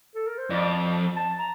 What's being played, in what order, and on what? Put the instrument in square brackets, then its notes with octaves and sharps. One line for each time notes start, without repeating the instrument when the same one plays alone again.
[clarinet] A4
A#4
C5
[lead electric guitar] F2 [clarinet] D5
[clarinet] A5
A#5